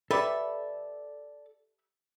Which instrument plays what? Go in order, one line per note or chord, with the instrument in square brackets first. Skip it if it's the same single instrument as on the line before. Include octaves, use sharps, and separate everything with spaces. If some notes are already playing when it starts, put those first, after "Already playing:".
[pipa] G4 B4 E5 [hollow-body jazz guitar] A4 D5